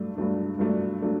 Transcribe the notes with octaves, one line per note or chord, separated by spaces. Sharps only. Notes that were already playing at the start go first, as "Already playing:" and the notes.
Already playing: G2 F#3 A3 D4
G2 F#3 A3 D4
G2 F#3 A3 D4
F#3 A3 D4